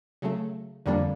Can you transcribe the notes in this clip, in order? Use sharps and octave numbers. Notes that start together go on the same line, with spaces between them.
C#3 F#3 A3
F2 D3 G3 A#3 D4